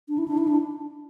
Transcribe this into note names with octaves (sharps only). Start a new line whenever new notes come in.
D4
E4
D4
E4
D4